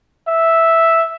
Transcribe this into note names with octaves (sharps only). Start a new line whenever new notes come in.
E5